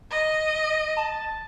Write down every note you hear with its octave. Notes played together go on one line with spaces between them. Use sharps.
D#5
A5